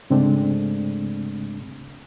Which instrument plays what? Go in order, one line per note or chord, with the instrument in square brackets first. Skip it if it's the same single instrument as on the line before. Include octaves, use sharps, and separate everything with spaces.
[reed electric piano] G#2 C#3 G#3 A3 C4 D4